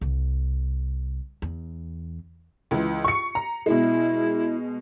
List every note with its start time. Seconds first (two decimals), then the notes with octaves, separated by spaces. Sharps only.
0.01 C2
1.42 E2
2.71 C#2 E3
3.04 C#6 C#7
3.35 A#5
3.66 B2 G#3 E4